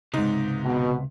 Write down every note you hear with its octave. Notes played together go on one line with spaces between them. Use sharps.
C#2 G#2 C3 D#4
B2